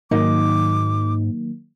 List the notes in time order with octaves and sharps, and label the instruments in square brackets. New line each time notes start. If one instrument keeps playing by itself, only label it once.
[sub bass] G#2 [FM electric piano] D#3 F#3 A#3 [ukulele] D#4 [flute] D6